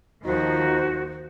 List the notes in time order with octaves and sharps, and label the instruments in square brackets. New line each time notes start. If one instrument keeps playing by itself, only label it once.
[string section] D#2 D#3 F3 [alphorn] D#4 [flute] F#4 [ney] C5